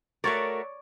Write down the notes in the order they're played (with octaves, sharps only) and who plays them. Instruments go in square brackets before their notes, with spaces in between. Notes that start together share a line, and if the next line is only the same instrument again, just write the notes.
[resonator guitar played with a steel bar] A3 F#4 A#4 [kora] C#5 D5